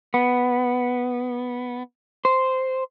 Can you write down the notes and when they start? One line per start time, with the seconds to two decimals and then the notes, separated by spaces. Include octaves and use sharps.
0.14 B3
2.25 C5